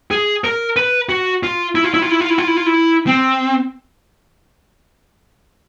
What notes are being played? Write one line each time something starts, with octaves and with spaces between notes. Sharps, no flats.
G#4
A#4
B4
F#4
F4
E4
F4
E4
F4
E4
F4
E4
F4
E4
F4
E4
C4